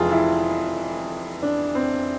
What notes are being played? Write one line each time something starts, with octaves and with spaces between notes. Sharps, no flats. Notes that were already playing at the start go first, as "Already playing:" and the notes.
Already playing: F1 F2 E3 G#3 F4 G#4
E4
D4
C4